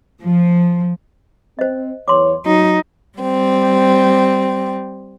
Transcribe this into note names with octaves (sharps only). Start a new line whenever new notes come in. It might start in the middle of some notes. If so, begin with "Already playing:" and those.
F3
C4 C5 D#5
E2 C#5 C6 D6
F#3 D#4
G3 C4